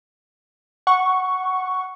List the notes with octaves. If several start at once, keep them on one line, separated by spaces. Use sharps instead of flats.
F#5 C#6